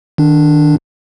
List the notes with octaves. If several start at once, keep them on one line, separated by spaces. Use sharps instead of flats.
D#3 D4